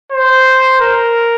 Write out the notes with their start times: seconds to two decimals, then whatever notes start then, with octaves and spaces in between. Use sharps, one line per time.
0.12 C5
0.81 A#4